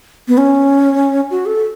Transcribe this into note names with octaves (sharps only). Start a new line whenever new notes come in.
B3
C#4
F#4
A4